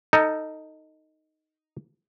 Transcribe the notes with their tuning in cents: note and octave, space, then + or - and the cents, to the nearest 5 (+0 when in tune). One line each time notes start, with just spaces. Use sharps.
D#4 +0 A4 +25